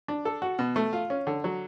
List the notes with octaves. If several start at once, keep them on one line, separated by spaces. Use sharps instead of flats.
D4
A4
F#4
B2
A3
F4
C#4
D3
F#3